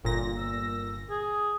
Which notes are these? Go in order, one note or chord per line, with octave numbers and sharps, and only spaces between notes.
G1 A#2 A#6
E6
G#4